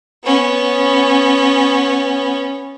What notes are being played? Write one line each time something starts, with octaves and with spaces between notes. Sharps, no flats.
B3 C#4